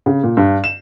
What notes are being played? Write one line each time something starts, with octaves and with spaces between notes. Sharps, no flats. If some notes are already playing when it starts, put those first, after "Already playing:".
C#3
A#2
G2
E7